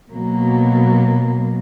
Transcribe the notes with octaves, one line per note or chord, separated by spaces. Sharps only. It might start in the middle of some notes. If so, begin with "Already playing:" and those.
B2 F#3 A#3